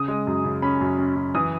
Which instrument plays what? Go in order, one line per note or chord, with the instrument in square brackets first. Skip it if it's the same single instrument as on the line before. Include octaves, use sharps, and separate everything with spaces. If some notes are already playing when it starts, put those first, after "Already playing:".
Already playing: [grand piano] C#3 D#6
G#3
F#2
C#3
C#4 B5
F#2
C#4
F#2
E3 D#6